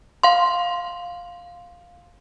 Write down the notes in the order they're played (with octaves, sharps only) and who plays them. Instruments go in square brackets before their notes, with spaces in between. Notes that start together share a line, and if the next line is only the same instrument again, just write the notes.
[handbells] F5 C6